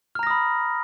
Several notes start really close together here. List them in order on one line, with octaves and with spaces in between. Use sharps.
F6 A#5 A#6 D#6 B5